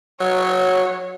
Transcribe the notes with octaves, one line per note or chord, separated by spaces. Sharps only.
F#3 C#5